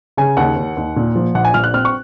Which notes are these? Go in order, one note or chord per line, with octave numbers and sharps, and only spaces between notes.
C#3 G#5
D#2 F#5
D#2
D#2
A#2
F3
A#1 F#5
G#5
A#1 F6
F#6
C4 F6
C#6